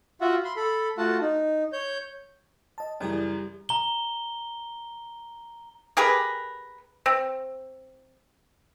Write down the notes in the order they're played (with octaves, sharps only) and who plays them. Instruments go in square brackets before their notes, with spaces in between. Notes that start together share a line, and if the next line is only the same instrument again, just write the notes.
[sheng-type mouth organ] F4 F#4 E5 F#5
B5 C6
A4 B5
A3 F4 F#4 F#5 A5
D#4
C#5 G6
[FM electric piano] D#5 A5
[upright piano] F#2 C#3 E3 [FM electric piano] G3 G4 D5
[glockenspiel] A#5 G7
[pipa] G4 G#4 A#4 B4
C4